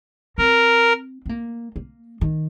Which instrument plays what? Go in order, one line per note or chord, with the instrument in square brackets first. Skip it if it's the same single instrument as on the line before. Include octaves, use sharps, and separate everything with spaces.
[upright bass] C4 [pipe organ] A#4
[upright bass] C4
A#3
A#3
D#3